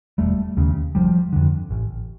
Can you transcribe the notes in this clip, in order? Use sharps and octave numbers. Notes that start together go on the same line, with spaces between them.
E1 G3 A3
D#2 C#3
F#1 F3 G3
F2 D3
A1